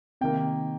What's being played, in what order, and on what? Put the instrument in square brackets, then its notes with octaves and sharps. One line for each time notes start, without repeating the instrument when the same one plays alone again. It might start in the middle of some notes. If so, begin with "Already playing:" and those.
[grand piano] C3 D#3 A#3 G5